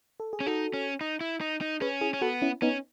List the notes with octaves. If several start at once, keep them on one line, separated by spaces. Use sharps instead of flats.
A4
G#4
C#4
D#4 F#4 A4
C#4
D#4
E4
D#4
D#4
C#4 G#4 B4
E4 G#4
C#4
B3 F#4 A4
C#4 E4
B3 C#4 D#4